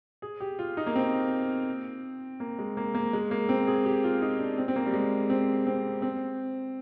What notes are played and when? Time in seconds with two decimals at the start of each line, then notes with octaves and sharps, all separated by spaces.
0.22 G#4
0.40 G4
0.59 F4
0.77 D#4
0.87 A#3
0.95 C4
2.40 A#3
2.59 G#3
2.77 A#3
2.95 A#3
3.13 G#3
3.31 A#3
3.49 C4
3.67 G#4
3.85 G4
4.04 F4
4.22 D#4
4.39 D4
4.58 C4
4.68 C4
4.76 A#3
4.86 G3
4.93 G#3
5.30 C4
5.67 C4
6.02 C4